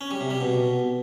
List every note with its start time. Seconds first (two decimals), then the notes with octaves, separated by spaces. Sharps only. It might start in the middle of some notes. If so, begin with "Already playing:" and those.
0.01 C#4
0.11 G3
0.21 C3
0.31 G3
0.41 B2